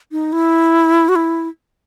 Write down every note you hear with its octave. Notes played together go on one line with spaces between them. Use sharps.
D#4
E4
F#4
E4